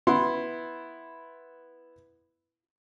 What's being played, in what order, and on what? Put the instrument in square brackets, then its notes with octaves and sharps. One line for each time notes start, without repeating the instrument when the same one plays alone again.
[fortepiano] B3 E4 C6